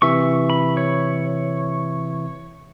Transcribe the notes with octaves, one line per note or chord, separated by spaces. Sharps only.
C3 E3 E5 C#6
B5
C#5